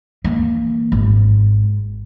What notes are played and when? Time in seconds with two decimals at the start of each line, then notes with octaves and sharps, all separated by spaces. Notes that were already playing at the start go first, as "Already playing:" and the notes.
0.24 E3 A#3
0.92 G#1